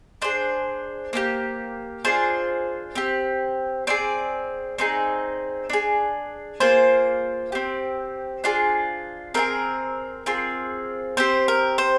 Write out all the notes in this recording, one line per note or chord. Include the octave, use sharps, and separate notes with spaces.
D4 G#4 C5
A#3 D4 G4
D4 F4 G#4 C5
C4 G4
C4 D#4 G#4 D5
C4 D#4 G#4
D4 G#4
A#3 F4 G#4 C5
C4 G4
D4 F4 G#4
C4 F4 G#4 A#4
C4 F4 G#4
C4 G4 C5
A#4
C5